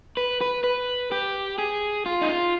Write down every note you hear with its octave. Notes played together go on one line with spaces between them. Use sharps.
B4
B4
B4
G4
G#4
F4
D#4
F4